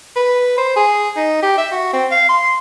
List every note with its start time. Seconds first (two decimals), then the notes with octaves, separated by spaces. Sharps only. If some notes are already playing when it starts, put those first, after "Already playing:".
0.16 B4
0.58 C5
0.76 G#4
1.16 D#4
1.42 G4
1.58 E5
1.72 F#4
1.93 C4
2.11 F5
2.29 C6